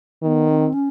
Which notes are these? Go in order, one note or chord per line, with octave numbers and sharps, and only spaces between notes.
D#3 B3
C4
C#4